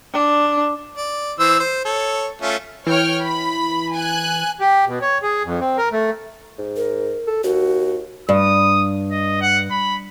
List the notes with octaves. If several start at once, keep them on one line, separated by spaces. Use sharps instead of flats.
D4
D5
E3 C5 E6
C5
A4 C#5
A3 C#4 F4
E3 C#5 G5 F6
B5
G#5 F#6
G4
B2
C#5
G#4
F2
C4
A#4
A3
G#2
A#4
A4
D#2 F#4
G2 D#6
D#5
F#5
B5